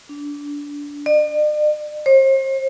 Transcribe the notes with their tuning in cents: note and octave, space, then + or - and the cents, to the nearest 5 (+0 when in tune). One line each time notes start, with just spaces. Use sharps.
D4 -20
D5 +45
C5 +40